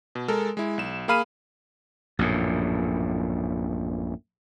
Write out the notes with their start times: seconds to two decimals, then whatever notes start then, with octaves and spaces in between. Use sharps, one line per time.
0.15 B2
0.28 G#3 A4 A#4
0.57 G#3 E4
0.78 B1 E7
1.08 A#3 G#4 F5 B5 F6 D#7
2.19 A#1 F#2 A2